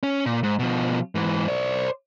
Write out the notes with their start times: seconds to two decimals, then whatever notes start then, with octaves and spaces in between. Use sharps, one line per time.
0.03 C#4
0.26 A#2
0.43 G#2
0.59 B2 F3
1.15 G#2 E3
1.48 C5 D5